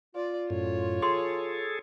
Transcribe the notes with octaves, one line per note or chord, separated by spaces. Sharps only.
F4 D5
F#2 A2 C#5
G#4 A4 C6